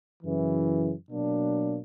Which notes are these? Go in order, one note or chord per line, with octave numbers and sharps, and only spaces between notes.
F#2 C#3 E3
B2 F#3 A#3 D4